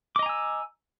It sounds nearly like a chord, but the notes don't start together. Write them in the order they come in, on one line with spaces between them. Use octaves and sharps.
D6 D#5 A#5 G#5 E6